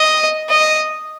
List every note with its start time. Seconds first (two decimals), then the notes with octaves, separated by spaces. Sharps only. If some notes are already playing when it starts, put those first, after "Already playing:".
Already playing: D#5
0.49 D#5